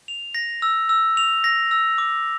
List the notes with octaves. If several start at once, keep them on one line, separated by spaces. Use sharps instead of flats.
F7
A#6
E6
E6
F7
A#6
E6
D6